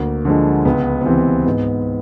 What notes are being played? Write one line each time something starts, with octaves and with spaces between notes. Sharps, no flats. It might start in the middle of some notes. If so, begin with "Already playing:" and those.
Already playing: D2 A#3
D3 F3 G#3
C#2 B3
B3
C3 E3 C4
G#2 B3